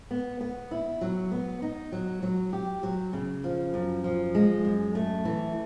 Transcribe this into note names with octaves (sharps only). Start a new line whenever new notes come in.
B3
B3
E4
F#3
B3
D#4
F#3
F#3
G4
F#3
C#3
F3
F#2
F3
G#3
F#2
A3
E3